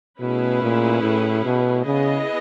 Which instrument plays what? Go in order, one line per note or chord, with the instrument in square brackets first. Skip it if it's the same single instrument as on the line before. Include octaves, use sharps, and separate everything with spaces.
[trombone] B2 [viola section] A3 C#4 E4 G#4 B4
[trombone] A#2
A2
B2
[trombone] C#3 [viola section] B3 E4 G#4 B4 D#5